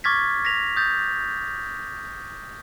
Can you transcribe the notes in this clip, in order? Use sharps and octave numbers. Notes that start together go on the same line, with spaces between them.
C#6 D6 F6 G#6 A6 B6
A#6 B6 F7
D#6 G6 A6